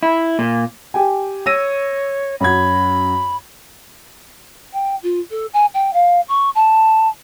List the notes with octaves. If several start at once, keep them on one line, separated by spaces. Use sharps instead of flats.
E4
A#2
G4 G5 G#5
C#5 E6 A#6 D#7
F#2 F#4 B5 G#6
G5
F4
A4
G#5
G5
F5
C#6
A5